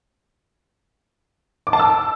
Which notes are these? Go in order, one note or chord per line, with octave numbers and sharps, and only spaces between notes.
D6
A5
E6